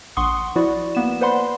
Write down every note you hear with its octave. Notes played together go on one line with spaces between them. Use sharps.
A#1 F#5 C6 C#6 D#6
F3 E4 F#4 D5
A#3 B3 E7
B4 C5 D5 F#5 B5 C6